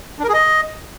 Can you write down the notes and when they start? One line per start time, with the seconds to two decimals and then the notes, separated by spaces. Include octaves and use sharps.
0.19 D4
0.24 A#4
0.29 G#4
0.34 D#5